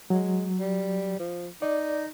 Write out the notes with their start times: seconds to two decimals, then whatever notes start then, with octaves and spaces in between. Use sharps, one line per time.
0.10 F#3 G#3
0.60 G3
1.19 F3
1.62 D#4 D5